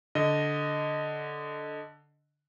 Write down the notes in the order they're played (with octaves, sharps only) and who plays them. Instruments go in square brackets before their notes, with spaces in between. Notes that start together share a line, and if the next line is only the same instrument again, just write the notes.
[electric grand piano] D3 D#5